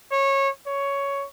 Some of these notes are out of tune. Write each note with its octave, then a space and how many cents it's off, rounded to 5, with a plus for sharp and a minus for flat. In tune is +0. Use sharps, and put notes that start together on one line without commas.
C#5 -20
C#5 +10